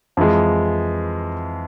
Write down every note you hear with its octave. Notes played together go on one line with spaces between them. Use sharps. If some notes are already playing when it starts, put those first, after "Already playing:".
F2 E3 G#3